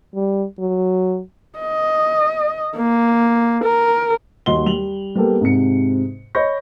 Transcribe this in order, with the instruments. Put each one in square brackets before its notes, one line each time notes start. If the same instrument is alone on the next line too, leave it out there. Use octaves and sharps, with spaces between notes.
[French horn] G3
F#3
[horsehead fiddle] D#5
A#3
A#4
[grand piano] D#2 G3 F#4 D#5 C6 G7
G3 F7 F#7
G3 A#3 B3 G4 A4
G#2 C3 C#7
C#5 D#5 B5 C#6 G6 A#6